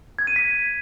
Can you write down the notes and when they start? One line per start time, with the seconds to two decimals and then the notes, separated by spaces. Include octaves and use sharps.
0.19 G#6
0.27 D#7
0.36 B6